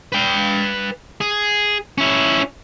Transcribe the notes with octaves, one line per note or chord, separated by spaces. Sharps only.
B4 G5
G#4
C#4 E4